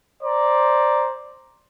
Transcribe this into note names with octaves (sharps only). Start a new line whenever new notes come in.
C5 D5 A#5